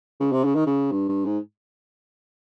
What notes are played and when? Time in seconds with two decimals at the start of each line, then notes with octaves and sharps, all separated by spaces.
0.20 C#3
0.32 C3
0.45 C#3
0.55 D#3
0.66 C#3
0.91 G2
1.09 G2
1.26 G#2